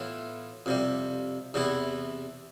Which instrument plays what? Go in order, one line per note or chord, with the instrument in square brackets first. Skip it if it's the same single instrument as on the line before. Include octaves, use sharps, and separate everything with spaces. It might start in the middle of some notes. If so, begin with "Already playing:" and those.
Already playing: [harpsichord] A2 E3 B3 F4 A4
F2 C3 G3
E2 C3 E3 B3 E4